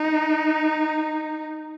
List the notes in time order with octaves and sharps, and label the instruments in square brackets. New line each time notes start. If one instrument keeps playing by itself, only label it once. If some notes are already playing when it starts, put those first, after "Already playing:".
Already playing: [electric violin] D#4